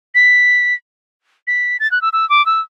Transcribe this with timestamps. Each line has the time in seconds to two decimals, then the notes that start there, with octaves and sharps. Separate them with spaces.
0.15 B6
1.47 B6
1.80 A6
1.91 F#6
2.02 E6
2.13 E6
2.30 D6
2.46 E6